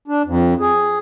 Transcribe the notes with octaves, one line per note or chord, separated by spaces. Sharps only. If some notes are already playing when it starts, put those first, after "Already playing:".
D4
F2
G#4